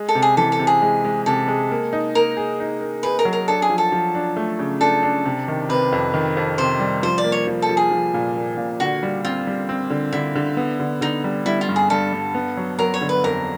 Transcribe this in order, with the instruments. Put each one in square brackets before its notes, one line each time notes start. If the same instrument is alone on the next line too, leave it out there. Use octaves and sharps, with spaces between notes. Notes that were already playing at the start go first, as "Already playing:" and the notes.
Already playing: [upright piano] G#3
[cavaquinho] A4
[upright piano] C3
[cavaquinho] G#4
[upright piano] E3 [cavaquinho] A4
[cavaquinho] A4
[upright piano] C3
[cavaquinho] G#4
[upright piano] G#3
G#3
[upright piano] C3 [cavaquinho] A4
[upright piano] G#3
A#3
D#4
[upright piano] A#3 [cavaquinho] A#4
[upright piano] G#4
D#4
A#3
[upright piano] G#4 [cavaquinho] B4
[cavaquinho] A#4
[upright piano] F#3
[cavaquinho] A#4
[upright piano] D4 [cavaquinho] A4
[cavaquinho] G#4
[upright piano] F3
[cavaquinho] A4
[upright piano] F3
D4
A3
C#3
[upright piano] D4 [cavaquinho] A4
[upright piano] D4
C3
D#3
[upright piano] C3 [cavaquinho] B4
[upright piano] F2
D#3
F2
[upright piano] C3 [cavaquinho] C5
[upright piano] G3
[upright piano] F3 [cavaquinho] C5
[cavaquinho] D5
[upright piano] A#3
[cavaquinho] C#5
[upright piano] F3
[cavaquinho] A4
[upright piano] F3
[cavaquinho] G#4
[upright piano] F3
A#2
A#3
A#2
[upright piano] D3 [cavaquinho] F#4
[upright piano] G3
[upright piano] C4 [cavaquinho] F4
[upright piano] G3
C4
D3
[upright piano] D3 [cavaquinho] E4
[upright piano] D3
B3
D3
[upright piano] D3 [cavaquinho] D#4
[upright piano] G3
[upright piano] G3 [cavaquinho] E4
[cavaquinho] F4
[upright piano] G2
[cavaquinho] G#4
[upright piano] G2 [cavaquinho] A4
[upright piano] G2
B3
F#3
[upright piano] F#3 [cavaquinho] A#4
[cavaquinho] C#5
[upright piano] D3
[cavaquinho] B4
[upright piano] F2 [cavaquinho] A#4